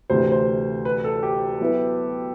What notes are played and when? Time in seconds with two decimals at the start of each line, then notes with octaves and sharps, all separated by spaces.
0.10 D2 C3 E3 C5
0.32 C5
0.85 B4
1.04 A4
1.23 G4
1.60 F#3 B3 E4 B4